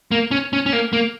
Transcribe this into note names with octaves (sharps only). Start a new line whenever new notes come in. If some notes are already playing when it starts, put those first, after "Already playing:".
A#3
C#4
C#4
C#4
A#3
A#3